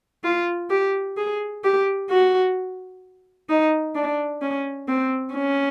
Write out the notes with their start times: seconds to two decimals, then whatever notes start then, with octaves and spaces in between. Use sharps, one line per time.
0.24 F4
0.70 G4
1.17 G#4
1.64 G4
2.10 F#4
3.49 D#4
3.95 D4
4.42 C#4
4.88 C4
5.35 C#4